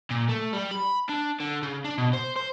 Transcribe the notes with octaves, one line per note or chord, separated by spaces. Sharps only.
A#2
A3
G3
B5
D4
D3
C#3
D4
B2
C5
C5